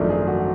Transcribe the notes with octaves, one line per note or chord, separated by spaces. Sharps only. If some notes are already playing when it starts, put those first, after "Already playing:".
Already playing: G#1 F#2 F3 A3 D4
G#4
F#4